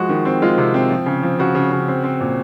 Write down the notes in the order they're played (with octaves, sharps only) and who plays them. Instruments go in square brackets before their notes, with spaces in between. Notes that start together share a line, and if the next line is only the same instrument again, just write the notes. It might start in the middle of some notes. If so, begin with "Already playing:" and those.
Already playing: [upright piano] F3 G#3 F#4
D#3
C4
G#3 F4
C3
C4
F3
C#3
F3
C#3 F#4
C#3
C#3
C4
C4
A#2